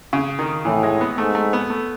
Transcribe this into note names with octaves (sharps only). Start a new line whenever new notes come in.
C#3
D#3
A2 E3
G#3
B3
G#2 A3
A3
B3
A3